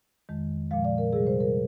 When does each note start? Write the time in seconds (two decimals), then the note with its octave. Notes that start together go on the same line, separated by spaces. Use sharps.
0.29 F2 D#3 G#3
0.71 A#2 F3 G#3 F5
0.85 D5
0.98 A#4
1.13 C3 G3 G#4
1.27 C5
1.41 A#4